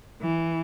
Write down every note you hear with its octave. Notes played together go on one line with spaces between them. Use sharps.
E3